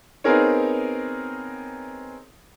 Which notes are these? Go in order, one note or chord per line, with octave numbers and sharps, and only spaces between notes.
B3 C4 D#4 G#4 A#4 C#5